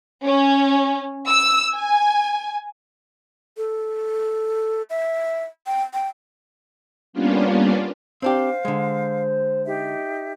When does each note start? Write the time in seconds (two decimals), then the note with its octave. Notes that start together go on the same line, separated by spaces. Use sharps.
0.25 C#4
1.29 E6
1.74 G#5
3.57 A4
4.90 E5
5.67 G5
5.94 G5
7.13 G3 A#3 B3 C#4 D4 F4
8.22 C4 D4 G4 C5 F5
8.65 D3 G#3
9.65 D#4 G4 E5